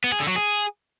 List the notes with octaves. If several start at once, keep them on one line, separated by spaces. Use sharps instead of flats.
B3
G#4
D3
F#3
G#4